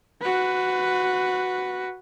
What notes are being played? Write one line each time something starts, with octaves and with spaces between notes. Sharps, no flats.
F#4 B4